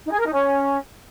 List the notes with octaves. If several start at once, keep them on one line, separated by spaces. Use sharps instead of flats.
D#4
G#4
A#4
D#4
C#4